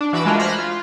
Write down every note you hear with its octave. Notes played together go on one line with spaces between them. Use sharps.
D4
E3 F#4 B5 D6 E6
G#3 A3 D4 F4 F#4 A#4
C5 B5 F6 F#6 G#6 A#6
F4